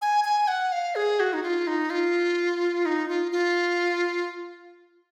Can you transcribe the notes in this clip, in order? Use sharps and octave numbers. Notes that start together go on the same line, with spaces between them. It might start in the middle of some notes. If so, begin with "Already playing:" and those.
G#5
G#5
F#5
F5
G#4
F#4
D#4
F4
D#4
F4
D#4
F4
F4